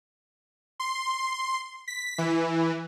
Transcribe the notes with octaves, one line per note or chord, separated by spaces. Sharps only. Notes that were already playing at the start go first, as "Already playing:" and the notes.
C6
B6
E3